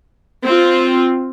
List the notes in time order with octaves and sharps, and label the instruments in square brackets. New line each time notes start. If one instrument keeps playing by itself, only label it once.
[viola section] C4 F4